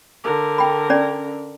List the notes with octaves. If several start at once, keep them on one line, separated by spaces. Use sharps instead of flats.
D3 A#4
G5 B5
C#4 D5